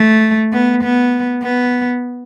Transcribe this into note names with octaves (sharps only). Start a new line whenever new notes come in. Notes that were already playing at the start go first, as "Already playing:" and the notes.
Already playing: A3
B3
B3
B3